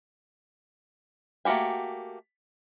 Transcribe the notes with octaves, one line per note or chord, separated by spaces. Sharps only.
A3 A#3 F#4 G4 G#5